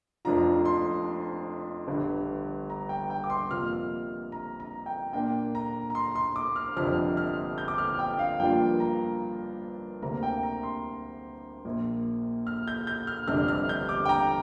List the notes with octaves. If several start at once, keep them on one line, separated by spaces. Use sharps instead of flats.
F1 F2 F3 D4 F4 A#5
C6
G1 G2 G3
A#5
G5
G5
D6
C6
F2 C3 A#3 F4 F6
A#5
A#5
G5
A#2 A#3 D4 G5
A#5
A#5
C6
C6
D6
F6
G1 F2 C3 F3 D4 F6
F6
G6
D6
F6
G5
F5
G2 F3 A#3 D4 F4 G5
A#5
D2 C3 A#3 D4 A#5
G5
A#5
C6
A#1 A#2 A#3
F6
G6
G6
F6
G1 F2 C3 G3 D4 F6
F6
G6
D6
G5
A#5